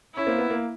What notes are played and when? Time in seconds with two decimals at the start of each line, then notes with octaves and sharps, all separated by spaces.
0.15 C#4 E4
0.27 A#3 C4
0.38 B3
0.50 A#3